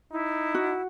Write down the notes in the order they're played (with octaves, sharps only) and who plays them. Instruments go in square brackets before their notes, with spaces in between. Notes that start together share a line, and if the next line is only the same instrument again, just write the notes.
[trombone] D#4 [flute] E4
[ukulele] F#4